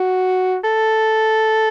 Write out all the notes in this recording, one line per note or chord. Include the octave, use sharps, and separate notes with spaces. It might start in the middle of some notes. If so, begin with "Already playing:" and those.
Already playing: F#4
A4